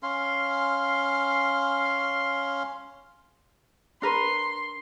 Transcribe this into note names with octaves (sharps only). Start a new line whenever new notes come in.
C#4 F5 C6
D4 A#4 B4 C6